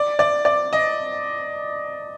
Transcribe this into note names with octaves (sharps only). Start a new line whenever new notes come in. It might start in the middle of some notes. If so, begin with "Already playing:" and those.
Already playing: D5
D5
D5
D#5